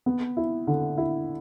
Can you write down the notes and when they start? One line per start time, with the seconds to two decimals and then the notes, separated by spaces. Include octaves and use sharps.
0.06 B3
0.37 E4
0.67 D3
0.98 E4